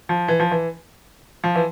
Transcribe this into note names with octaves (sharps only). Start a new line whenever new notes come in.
F3
E3
F3
E3
F3
E3